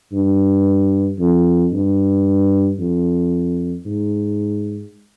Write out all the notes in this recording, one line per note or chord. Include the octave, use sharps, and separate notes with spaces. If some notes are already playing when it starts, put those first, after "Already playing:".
G2
F2
G2
F2
G#2